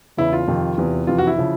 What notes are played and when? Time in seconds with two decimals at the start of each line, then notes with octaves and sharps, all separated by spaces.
0.17 E2 C#3 E3 E4
0.33 F4
0.48 F2 C3 D#3
0.78 E2 C3 E3
1.07 F2 C3 E3 F4
1.18 F#4
1.27 E4
1.38 C#3 F3